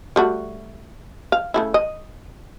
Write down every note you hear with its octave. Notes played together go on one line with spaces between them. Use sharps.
G3 A3 F#4
F5
C#3 A3 E4
D#5